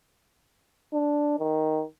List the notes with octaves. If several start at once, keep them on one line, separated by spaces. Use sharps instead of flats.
D4
D#3